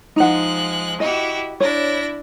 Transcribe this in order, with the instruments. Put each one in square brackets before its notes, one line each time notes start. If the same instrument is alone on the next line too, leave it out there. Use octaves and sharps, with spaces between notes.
[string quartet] F3 G#3 F#6 [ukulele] D#4 F#5
[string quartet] E4 F#4 G4 [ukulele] D#5
[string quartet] D4 E4 A#6 [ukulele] C#5